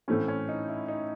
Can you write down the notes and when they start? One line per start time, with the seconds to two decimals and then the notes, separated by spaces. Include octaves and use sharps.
0.08 A2 E3 A3 C4 C#4
0.28 C#4
0.49 D#4
0.69 E4
0.88 D#4